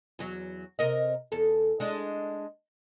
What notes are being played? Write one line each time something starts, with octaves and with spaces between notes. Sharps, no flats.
E2 F#3
C3 A#4 D#5
E2 A4
G#3 D4